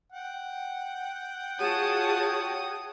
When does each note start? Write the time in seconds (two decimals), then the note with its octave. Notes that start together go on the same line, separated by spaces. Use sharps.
0.12 F#5 G5
1.59 F4 F#4 G#4 C#5 A5 D#6